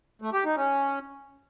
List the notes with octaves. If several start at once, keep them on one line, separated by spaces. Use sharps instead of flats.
A3
G4
D#4
C#4